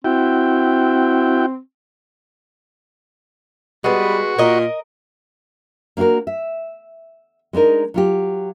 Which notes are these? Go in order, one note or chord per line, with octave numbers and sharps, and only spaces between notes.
C4 E4 F#4 G5
G3 G#3 B3 F#4
A#2 A#4 D#5
A#3 D4 F4 F#4 A#4
E5
G#3 D4 D#4 A#4
F#3 F4 G4